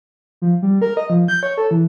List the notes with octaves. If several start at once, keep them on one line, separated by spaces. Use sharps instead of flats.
F3
G3
A#4
D#5
F3
G6
C#5
A4
E3